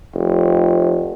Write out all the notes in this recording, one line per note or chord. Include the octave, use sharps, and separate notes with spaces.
F1